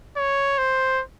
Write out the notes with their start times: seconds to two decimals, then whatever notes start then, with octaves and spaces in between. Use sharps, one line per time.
0.17 C#5
0.58 C5